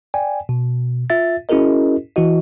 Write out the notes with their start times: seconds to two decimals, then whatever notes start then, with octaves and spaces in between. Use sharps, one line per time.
0.14 D5 G5 G#5
0.49 B2
1.10 F4 E5 A6
1.49 C#4 E4 F#4 G#4 A#4 D#5
2.16 E3 E4 F#4 D#5